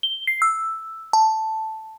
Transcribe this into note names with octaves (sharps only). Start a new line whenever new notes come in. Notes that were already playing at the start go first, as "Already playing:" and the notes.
G7
C7
E6
A5